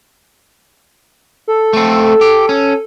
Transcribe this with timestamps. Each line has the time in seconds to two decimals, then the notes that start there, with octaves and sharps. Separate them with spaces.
1.48 A4
1.73 A3 C4
2.21 G4
2.49 C#4